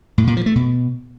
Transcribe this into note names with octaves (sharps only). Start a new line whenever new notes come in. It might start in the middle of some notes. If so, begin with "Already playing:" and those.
A2
A#2
F3
A3
B2